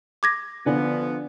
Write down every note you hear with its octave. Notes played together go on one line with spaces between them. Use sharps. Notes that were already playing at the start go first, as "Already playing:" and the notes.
D6 G#6 A#6
D3 F3 B3 D5 G#5